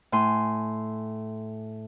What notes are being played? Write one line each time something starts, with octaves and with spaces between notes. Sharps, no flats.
A2 G#5 C6